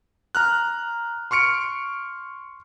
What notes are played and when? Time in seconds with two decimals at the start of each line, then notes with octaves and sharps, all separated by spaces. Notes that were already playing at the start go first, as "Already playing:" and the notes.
0.35 A#5 F6 F#6
1.31 C6 C#6 F6 C#7 D7